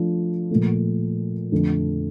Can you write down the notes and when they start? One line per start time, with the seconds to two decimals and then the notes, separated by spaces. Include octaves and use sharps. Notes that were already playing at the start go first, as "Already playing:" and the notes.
Already playing: F3 A3 D4 F4
0.51 A#2 F3 A3
1.52 F2 D3 A3